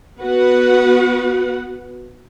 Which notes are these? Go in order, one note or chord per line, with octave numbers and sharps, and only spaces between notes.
B3 F#4 B4 F#5